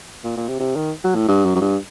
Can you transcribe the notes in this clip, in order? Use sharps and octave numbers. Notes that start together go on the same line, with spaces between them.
A#2
A#2
C3
C3
D#3
F#3
A2
G2
F#2
F#2
G2